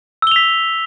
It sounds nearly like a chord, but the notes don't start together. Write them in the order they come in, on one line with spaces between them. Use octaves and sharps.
E6 G7 F7 B6